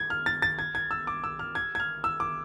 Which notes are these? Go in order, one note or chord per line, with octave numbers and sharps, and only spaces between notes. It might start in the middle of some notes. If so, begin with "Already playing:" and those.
Already playing: G#6
F6
A6
A6
G#6
G#6
E6
D6
E6
F6
G#6
G#6
F6
E6
D6